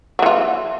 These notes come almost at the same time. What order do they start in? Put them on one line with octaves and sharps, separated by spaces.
F#3 E3 F4